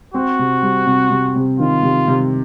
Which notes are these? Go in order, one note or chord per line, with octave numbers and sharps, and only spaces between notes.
C4 F#4
C3
G3
C3
C3
C3
D#3 F4
C3
C3